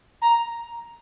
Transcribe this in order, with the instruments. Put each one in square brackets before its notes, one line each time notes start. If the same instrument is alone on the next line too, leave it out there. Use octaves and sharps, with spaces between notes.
[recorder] A#5